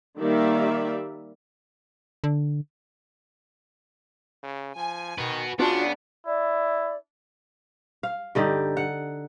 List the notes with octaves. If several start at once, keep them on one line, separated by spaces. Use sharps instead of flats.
D#3 G3 A#3 D5 E5 F5
D3
C#3
F3 G#5
D#3 F#4 B4
C#3 B3 D4 F4 F#4 C#5
E4 D5
F5
G2 D3 D#4 G4
F#5